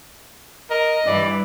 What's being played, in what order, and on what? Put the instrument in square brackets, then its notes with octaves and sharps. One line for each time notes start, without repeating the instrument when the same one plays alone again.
[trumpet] A#4 [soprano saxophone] D#5
[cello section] G2 E3 [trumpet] D5